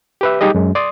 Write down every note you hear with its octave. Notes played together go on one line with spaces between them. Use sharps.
G4 B4 E5
G3 D#4 G4 G#4 D#5
F#2 G#3
D5 C6 D#6